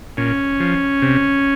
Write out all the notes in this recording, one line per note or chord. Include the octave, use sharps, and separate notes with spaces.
A#2 C#4
F3
C3